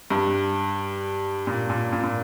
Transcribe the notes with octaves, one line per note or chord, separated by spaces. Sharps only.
G2
A#2
A#2
A#2
A#2